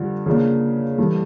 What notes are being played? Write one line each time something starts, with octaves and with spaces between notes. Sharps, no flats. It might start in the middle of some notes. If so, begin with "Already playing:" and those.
Already playing: G2 D3 F3
C#3 F3 A#3 D4
G2 E3 A3